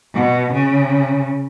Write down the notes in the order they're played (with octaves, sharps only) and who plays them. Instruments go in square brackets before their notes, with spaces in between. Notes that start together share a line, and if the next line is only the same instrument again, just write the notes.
[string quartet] B2
C#3